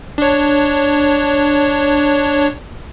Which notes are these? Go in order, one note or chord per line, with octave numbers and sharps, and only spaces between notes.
D4 C#5